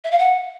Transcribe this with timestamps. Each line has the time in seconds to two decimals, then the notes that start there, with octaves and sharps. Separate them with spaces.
0.04 E5
0.11 F5
0.18 F#5